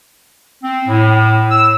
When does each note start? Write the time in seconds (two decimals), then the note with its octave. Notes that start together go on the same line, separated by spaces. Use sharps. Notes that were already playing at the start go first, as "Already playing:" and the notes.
0.64 C4
0.87 A2
1.51 E6